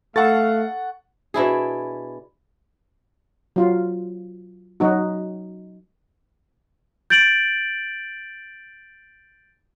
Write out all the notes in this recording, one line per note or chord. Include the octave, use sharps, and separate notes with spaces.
A3 A4 F5 F#5 C#6 A6
B2 D4 E4 G#4
F#3 F4
F#3 D#4 F#4
G6 A6 D7 F#7